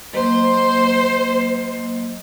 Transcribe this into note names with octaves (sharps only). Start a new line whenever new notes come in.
F#3 A#3 C5 D#5